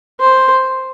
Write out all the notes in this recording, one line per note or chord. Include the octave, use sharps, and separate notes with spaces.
C5